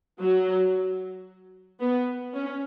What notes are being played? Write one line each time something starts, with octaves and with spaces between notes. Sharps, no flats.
F#3
B3
C#4